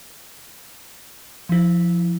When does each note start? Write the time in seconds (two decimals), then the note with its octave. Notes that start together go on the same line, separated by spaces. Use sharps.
1.49 F3 E4